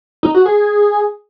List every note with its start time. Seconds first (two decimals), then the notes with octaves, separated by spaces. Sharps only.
0.23 D#4
0.35 F#4
0.46 G#4